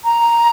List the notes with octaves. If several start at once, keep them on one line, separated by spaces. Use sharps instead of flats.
A#5